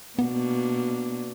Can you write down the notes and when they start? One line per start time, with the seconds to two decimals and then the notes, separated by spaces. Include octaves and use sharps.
0.19 B2 A#3 B3 D4